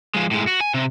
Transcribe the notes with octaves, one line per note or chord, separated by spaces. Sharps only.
F3 G#3
A2 G#3
F#4
G#5
C3